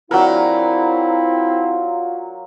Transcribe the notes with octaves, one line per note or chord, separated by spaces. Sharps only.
F#3 A3 C4 D4 E4 F4 A#4